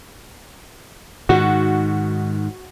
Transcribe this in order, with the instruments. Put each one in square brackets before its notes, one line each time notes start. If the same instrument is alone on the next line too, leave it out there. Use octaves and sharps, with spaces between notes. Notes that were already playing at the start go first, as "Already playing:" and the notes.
[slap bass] G#2 D#3 [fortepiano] F#4